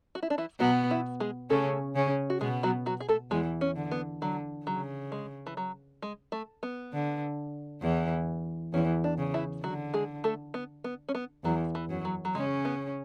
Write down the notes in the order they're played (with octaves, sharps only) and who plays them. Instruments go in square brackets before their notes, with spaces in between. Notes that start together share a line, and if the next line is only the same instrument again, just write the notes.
[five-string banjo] F#4
E4
D4
E3 E4
[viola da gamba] B2 B3 [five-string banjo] F#3 F#4
[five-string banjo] E3 E4
G#3 G#4
[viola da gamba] C#3 C#4 [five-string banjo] A3 A4
[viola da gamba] C#3 C#4
[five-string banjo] F#4
[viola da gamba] B2 B3 [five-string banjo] G#3 G#4
[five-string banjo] F#3 F#4
F#3 F#4
G#4
A3 A4
[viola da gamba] E2 E3 [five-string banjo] G#3 G#4
[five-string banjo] C#4
[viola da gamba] D3
[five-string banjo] B3
[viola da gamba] D3 [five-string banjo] F#3
[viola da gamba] C#3 [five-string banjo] F#3
[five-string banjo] G#3
E3
F#3
G#3
A3
B3
[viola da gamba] D3
E2 E3
[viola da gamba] E2 E3 [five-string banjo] C#4
[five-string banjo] D4
[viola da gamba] C#3
[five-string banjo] E3 E4
[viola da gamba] D3 [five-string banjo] F#3 F#4
[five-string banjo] G#3 G#4
A3 A4
B3
B3
C#4
B3
[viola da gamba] E2 E3 [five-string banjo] F#3
[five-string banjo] E3
[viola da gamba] F#2 F#3
[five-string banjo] F#3
F#3
[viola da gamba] C#3 C#4 [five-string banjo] G#3
[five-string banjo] B3